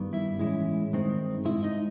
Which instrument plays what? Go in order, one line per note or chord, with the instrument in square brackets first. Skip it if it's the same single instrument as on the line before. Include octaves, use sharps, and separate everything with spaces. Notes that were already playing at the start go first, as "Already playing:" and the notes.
Already playing: [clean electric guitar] G2 D#3 G3 B3
E4 E5
A2 E3 G#3 C#4 E4
G2 D#3 G#3 C4
G#2 D#3 G#3 E4 E5
D#4 D#5